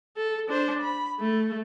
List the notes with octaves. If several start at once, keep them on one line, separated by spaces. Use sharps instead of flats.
A4
D4 C5
B5
A3